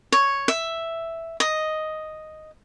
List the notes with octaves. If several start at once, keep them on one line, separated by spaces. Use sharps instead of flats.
C#5
E5
D#5